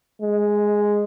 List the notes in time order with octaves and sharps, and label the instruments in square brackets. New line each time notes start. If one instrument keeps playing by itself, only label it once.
[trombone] G#3